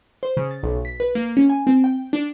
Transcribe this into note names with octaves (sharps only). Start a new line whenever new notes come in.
C5
C#3
A6
B1
B6
B4
A#3
C#4
G#5
C4
G5
D4